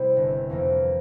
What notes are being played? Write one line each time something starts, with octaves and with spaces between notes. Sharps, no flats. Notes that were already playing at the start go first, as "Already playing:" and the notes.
Already playing: C3 G3 C4 E4
G1
F2 E3 A#3